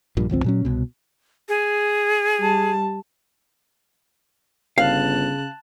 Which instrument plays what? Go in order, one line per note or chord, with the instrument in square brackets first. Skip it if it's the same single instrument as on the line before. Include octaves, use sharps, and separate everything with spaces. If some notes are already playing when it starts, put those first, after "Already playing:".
[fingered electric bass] A#1 G2 A#2
G#1 C#2 F3 C4
A#2 F#3 C#4
C2 B2
[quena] G#4
[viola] G3 A5
[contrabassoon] G1 [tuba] C#3 [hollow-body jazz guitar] F5 [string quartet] A5 F#6